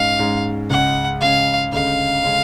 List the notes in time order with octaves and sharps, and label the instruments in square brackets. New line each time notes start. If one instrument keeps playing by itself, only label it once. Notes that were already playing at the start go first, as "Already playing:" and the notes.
Already playing: [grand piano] G#2 G#3 C#4 [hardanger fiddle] F5
[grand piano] G#2 G#3 C#4
[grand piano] C#2 C#3 G#3 C#4 [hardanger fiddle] F#5
[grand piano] C#2 C#3 G#3 C#4 [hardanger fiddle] F5
[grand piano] D2 C#3 G#3 C#4 [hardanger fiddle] F5
[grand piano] C#3 G#3 C#4